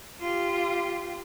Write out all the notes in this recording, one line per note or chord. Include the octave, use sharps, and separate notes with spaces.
F4 G4